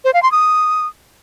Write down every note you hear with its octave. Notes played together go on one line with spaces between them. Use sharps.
C5
F5
C6
D#6